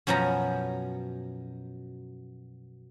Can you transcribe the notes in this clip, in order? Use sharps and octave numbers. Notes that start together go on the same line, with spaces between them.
F#2 B2 F3 C#4 A#5